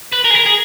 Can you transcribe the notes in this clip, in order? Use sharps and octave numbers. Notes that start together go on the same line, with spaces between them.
B4
A#4
G#4
A#4
G#4